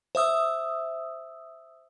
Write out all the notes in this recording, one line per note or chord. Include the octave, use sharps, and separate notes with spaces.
C5 E5 D#6 E6